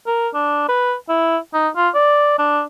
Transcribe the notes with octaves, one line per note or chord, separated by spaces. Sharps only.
A#4
D4
B4
E4
D#4
F4
D5
D4